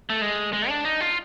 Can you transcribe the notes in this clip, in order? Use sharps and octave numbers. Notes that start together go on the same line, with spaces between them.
A3
G#3
G#3
D4
D#4
F4